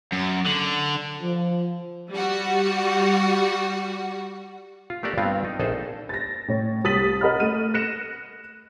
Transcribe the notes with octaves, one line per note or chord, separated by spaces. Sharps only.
F#2
D3
F3
G3 F#4
F4
A3 D4 G4 A4 A#4 D5
G2 B3 C4 F4 F5
D#4
A#1 D#4 G#4 A4 C5
A6 A#6
A2 C#5
C2 D#6 A6 B6 D#7 F#7
A#4 D#5 F#5 B5 F6
A3 D#7
F#6 A#6 C#7 E7